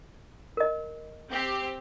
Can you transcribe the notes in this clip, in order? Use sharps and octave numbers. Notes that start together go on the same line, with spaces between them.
A#4 D#5
C4 G4